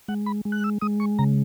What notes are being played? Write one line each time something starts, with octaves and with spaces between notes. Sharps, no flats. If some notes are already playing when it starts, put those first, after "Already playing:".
G#3 F#5
B5
G#3
F#6
E6
G#3 D#6
C#6
C#3 A#5